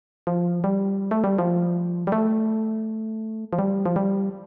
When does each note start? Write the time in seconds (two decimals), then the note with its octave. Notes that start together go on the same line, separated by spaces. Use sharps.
0.27 F3
0.64 G3
1.11 A3
1.24 G3
1.39 F3
2.07 G3
2.12 A3
3.53 F3
3.59 G3
3.86 F3
3.96 G3